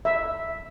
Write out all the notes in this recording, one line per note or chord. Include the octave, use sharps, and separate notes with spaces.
E5